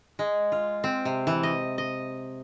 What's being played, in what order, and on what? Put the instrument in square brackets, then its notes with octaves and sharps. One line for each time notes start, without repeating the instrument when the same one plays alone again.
[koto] G#3
F4
C4
C3
E3
D#5
D#5